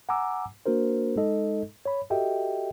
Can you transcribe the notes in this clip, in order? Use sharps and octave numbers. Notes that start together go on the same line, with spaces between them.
F#5 G#5 A#5 D6 E6
A#3 D4 F#4 A#4 C5
G#3 D#4 A4 D#5
C#5 B5
F#4 G4 A4 D#5 E5 G5